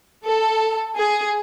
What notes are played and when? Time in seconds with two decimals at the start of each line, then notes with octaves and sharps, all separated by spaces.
0.25 A4
0.97 G#4